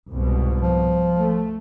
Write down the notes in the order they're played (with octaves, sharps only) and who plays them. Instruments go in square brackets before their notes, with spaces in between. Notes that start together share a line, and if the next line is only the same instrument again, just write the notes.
[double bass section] C2 G#2 B2
[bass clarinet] F3
[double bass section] A3